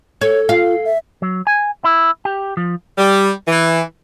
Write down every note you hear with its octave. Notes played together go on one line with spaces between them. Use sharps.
A4 C#5
F4 F5
E5
F#3
G#5
E4
G4
F3
G3
E3